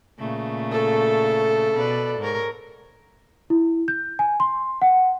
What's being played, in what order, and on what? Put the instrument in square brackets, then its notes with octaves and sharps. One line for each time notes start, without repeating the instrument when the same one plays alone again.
[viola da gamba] A#2 C#3 A3
[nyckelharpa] A4
[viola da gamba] B2 B4 D5
G#2 A#4 C#5
[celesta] E4
G6
G#5
C6
F#5